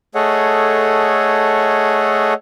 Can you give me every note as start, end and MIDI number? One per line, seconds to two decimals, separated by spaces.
0.15 2.34 57
0.15 2.34 68
0.15 2.34 69
0.15 2.34 73
0.15 2.34 75
0.15 2.34 78